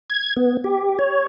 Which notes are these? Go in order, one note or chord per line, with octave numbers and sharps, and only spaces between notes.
G#6
B3
G4
C#5